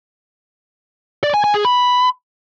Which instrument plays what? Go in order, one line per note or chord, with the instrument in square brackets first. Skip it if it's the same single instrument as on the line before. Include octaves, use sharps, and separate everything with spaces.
[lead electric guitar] D5
G#5
G#5
G#4
B5